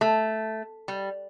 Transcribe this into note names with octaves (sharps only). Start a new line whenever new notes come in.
A3
G3